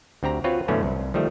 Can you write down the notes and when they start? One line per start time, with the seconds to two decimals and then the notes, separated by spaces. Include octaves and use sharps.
0.23 D2 C4 G4 A#5
0.44 C4 F4 F#4 B4 C#5
0.68 F#2 B2 D3 E3 A3 C#4
0.83 C2
1.14 D#3 F3 G3 A3